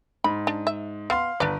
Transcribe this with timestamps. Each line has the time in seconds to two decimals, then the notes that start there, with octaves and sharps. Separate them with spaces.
0.24 G#2 B5
0.47 D4
0.67 E5
1.10 B3 F5 C6
1.40 G1 D4 B4 D5